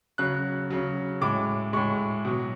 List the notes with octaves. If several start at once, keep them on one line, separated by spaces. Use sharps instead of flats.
C#3 F#3 F#6
C#3 F#3
A2 G#3 D6
A2 G#3 C#6
B2 F#3